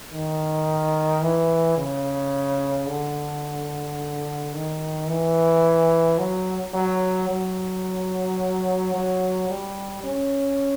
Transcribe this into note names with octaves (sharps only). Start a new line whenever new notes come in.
D#3
E3
C#3
D3
D#3
E3
F#3
F#3
F#3
F#3
G3
C#4